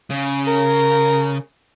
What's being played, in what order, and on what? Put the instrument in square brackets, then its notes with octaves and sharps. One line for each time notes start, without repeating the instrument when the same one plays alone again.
[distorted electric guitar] C#3
[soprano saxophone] A#4